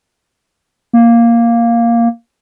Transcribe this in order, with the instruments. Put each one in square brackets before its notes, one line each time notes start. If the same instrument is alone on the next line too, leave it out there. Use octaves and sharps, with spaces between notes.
[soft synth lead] A#3